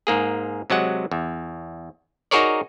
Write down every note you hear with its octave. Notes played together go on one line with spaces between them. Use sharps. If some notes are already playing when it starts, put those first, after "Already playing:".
G#2 A#3 G#4
C3 F#3 G#3 F#5
E2
D#4 F#4 G#4 A#4 C#5 D5